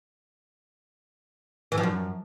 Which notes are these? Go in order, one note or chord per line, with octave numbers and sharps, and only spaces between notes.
E3
F3
F#2